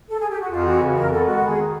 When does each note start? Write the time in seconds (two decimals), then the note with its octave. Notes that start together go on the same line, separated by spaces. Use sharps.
0.09 A4
0.19 G#4
0.31 G4
0.40 F#4
0.51 F2 F4
0.65 E3 F#4
0.81 C#3
0.95 F2 A#4
1.11 B3 A4
1.27 G#3 F#4
1.38 G4
1.42 D#3 G#4